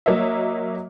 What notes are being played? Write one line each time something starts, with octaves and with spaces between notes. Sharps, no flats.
F#3 A#3 C#5 D#5 E5